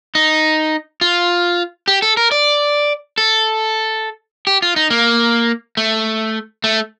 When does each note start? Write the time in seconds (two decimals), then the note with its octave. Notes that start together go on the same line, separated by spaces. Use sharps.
0.15 D#4
1.01 F4
1.88 G4
2.02 A4
2.17 A#4
2.32 D5
3.18 A4
4.47 G4
4.62 F4
4.76 D#4
4.90 A#3
5.77 A3
6.64 A3